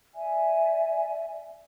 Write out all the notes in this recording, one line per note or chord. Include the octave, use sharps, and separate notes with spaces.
D5 E5 G#5